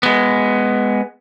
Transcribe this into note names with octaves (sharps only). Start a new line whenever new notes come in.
G#3 B3